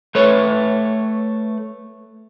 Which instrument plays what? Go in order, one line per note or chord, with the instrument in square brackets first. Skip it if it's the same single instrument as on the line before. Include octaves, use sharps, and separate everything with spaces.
[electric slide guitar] A3 B4 C#5